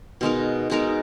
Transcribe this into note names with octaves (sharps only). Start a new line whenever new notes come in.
B2 G#3 D#4 A#4
B2 G#3 D#4 A#4